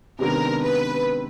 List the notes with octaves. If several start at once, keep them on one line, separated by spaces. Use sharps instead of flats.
C3 D#3 G#3 B3 D4 A#4
B4